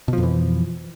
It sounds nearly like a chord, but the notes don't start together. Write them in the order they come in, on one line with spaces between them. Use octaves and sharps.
B2 F3 F2 E3